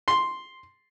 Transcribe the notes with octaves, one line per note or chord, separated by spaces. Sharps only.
C6